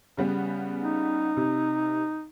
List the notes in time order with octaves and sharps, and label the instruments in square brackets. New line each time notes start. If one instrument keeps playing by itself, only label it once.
[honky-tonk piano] C#3 G3 B3
[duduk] D#4
[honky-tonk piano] C3